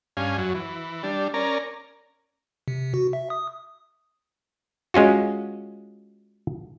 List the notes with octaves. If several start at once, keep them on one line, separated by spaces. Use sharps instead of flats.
G2 C#4 F5 G#5
F#2 F#3
E3
G3 D4
C#4 A#4 D5 A#5
C3
F#4
E5
D#6
G#3 C#4 F4 F#4